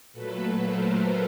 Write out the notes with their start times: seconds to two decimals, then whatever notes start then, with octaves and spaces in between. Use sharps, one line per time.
0.13 A#2 F#3 A3 A4 B4
0.61 A#4 C5